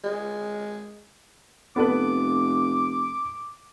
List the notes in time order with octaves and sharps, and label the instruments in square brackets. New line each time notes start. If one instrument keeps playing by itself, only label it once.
[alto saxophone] G#3
[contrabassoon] F1 [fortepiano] B3 A4 B4 [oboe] D6